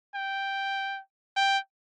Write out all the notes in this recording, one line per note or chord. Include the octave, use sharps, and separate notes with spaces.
G5
G5